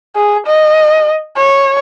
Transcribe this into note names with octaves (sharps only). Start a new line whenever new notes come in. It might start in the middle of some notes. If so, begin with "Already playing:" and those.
G#4
D#5
C#5